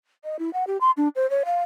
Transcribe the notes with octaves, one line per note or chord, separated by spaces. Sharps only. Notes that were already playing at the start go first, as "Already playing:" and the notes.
D#5
E4
F#5
G4
C6
D4
C5
C#5
F5